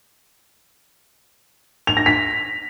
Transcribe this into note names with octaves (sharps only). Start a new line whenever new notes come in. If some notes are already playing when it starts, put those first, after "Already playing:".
F7
A#6
B6